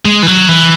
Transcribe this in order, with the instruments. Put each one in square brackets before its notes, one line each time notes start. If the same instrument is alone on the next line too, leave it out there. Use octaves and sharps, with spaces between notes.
[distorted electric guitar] G#3
E3
F#3
E3